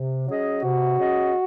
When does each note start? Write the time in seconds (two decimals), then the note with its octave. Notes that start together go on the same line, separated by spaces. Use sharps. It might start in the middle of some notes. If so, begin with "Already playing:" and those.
Already playing: C3
0.28 F#3 C#4 G#4 D#5
0.63 C3 F#4
0.99 F#3 C#4 G#4 D#5